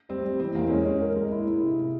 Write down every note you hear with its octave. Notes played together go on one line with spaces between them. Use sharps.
G3 C4
G3
E3 C4
E2 A#3
G#3 C#4
C#4
A#4
G#3
E4
E4
C3